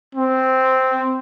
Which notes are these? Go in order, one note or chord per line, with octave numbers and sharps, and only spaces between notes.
C4